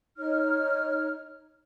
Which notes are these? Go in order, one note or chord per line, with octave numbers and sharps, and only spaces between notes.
D#4 C#5 F6